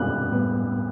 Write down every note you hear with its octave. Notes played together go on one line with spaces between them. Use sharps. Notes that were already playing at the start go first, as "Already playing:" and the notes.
Already playing: B2 G3 B3 D4 G4 F#6
A2 G3 B3